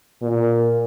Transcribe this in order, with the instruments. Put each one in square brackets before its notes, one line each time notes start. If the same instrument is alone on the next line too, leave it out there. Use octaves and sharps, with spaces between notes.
[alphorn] A#2